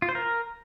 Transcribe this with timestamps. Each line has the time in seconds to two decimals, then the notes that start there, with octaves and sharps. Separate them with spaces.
0.02 F4
0.09 C5
0.15 A#4